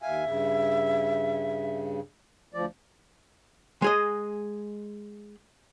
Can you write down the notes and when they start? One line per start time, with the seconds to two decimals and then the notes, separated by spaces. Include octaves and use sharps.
0.02 D#2 E5 F5 G#5
0.25 G2 C#3
2.54 D2 F3 D5
3.82 G#3 G#4 D#5